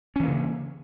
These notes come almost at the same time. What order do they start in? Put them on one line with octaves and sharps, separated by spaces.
C#4 E3 A#3 C#3